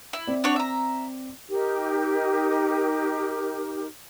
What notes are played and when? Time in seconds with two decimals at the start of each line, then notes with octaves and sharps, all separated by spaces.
0.13 E4
0.27 C4 D5
0.44 D4 F#4 C#5
0.56 E5 A#5
1.50 D#4 G4 A#4